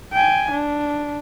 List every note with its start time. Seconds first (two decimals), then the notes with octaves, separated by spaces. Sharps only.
0.13 G5 G#5
0.51 D4